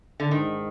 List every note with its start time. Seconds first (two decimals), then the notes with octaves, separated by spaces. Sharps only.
0.20 D3
0.31 G#2 D#3